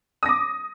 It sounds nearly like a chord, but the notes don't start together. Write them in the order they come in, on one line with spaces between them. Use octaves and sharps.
D#6 A#6 D6